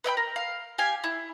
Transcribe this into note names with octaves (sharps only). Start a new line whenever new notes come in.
B4 E5 G5 B5
A#4
F5
G4 F5 G#5
E4